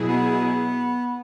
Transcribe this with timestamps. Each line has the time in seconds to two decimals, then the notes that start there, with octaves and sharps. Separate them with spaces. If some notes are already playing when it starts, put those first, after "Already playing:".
Already playing: B2 F#3 E4 G#4
0.08 B3